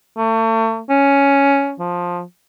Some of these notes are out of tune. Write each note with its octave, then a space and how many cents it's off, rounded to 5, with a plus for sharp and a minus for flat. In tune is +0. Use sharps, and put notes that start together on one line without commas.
A3 +35
C#4 +5
F3 +15